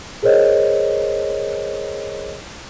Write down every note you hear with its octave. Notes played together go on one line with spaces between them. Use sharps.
G#4 A#4 C5 C#5 D#5